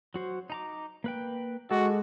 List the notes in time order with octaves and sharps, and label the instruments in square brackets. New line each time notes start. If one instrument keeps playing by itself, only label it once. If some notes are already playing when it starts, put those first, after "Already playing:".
[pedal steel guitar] F#3 F#4 C5
D#4 A#5 D6
A#3 B4 G5
[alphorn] G#3 [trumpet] F#4 [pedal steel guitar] A4 D6